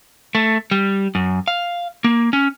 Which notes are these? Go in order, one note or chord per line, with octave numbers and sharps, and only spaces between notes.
A3
G3
F#2
F5
A#3
C#4